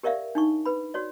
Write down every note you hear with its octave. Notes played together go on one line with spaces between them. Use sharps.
G4 A#4 D5 E5 F5
D4 D#4 C#6
B4 B5
F#4 C#5 D5